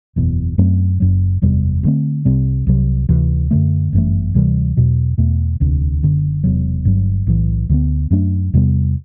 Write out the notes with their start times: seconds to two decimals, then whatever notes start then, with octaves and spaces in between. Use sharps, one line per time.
0.16 F#1 E2 B2
0.58 F#2 F#3 A3 C4
1.00 F#1 F#2 F#3
1.42 F#1 E2 C3 G3
1.83 D2 D3 A3 C4
2.25 C2 C3 G3 C4
2.67 C2 C3 F#3
3.09 D2 C3 E3
3.51 F#2 D3 A3
3.93 G1 F#2 E3 A3
4.34 D2 C3 E3 G3
4.77 E2 B2 F#3
5.18 E2 B2 A3
5.60 E1 D2 C3
6.03 F#1 F#2 D3
6.44 E1 E2 C3 F#3
6.85 G1 G2 F#3
7.27 B1 A2 E3
7.69 D2 D3 F#3 B3
8.11 F#2 F#3 A3 D4
8.53 E2 C3 G3 B3